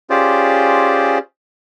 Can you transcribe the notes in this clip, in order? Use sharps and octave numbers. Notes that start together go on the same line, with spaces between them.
C#4 F4 G4 G#4 C5 D5